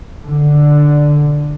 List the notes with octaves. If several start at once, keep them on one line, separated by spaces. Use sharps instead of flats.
D3